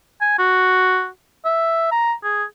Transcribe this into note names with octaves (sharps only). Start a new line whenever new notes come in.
G#5
F#4
E5
A#5
G#4